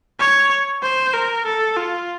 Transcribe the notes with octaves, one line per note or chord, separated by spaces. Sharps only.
C#5
C5
A#4
A4
F4